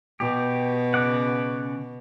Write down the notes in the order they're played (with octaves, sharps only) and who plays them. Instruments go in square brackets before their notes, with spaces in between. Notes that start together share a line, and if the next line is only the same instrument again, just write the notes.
[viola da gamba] B2 [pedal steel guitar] G4
[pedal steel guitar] C#3 D5 F#5